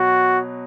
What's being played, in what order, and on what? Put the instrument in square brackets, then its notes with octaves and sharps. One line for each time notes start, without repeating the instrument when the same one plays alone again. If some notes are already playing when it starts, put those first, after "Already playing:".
Already playing: [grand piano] B2 F#3 [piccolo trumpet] F#4